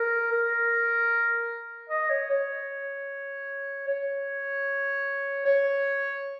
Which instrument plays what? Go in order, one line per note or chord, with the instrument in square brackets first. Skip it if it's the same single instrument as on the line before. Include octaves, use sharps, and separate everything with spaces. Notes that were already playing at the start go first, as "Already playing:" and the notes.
Already playing: [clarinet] A#4
A#4
D#5
C#5
C#5
C#5
C#5